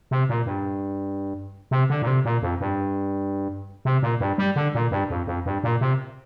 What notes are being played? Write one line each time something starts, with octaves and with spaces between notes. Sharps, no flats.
C3
A#2
G2
C3
D3
A#2
C3
A#2
F2
G2
C3
A#2
G2
G3
D3
A#2
G2
F2
F2
G2
A#2
C3